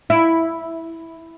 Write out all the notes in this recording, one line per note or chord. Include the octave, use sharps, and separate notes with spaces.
E4